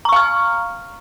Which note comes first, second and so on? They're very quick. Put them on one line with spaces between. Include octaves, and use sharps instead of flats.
A#5 C#6 F5 F6